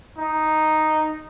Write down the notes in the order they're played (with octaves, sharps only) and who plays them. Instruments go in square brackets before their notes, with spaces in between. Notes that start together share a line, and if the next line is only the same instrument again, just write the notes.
[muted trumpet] D#4